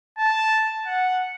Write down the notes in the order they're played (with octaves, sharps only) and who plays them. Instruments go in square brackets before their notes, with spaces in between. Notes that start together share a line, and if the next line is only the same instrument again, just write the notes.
[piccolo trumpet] A5
F#5